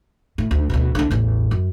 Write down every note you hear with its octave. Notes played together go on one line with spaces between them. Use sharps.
A2
D2
D2 B2
C2 D3
A1 E2
F#2